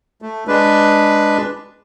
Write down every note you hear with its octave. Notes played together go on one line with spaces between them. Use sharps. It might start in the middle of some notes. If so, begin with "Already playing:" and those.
A3
G#3 D4 B4